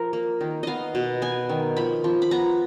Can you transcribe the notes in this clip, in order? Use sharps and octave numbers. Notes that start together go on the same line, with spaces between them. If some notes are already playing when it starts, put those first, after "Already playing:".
Already playing: F3 A#4
A#3
D#3
B3 D#5 F5
B2
B3 G#5
D#3
F3 B5
F3
B5
B3 A#5